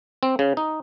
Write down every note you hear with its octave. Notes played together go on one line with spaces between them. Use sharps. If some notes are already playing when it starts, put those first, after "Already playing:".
C4
C#3
D#4